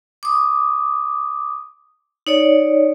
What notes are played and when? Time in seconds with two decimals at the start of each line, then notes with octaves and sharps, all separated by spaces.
0.23 D6 D#6
2.27 D#4 C#5 D5